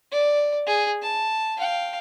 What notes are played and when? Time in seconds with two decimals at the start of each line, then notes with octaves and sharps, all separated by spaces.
0.12 D5
0.67 G#4
1.02 A5
1.57 F5 G5